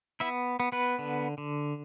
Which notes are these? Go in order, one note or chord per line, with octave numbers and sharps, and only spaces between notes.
B3 E4 E5
B3
B3 B4
D3
D3